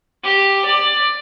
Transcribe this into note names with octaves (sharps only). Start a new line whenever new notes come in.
G4
D5